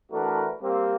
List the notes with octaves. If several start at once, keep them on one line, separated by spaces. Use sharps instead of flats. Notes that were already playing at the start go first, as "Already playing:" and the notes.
E3 A3 D4 F#4 A#4 B4
G3 A#3 C4